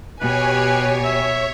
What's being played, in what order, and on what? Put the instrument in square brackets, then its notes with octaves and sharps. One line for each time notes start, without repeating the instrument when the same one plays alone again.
[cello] B2 [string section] G4 G#5 [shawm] B4 [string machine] C#5
[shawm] E5